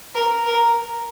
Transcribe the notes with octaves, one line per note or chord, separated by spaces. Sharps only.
A#4
A#4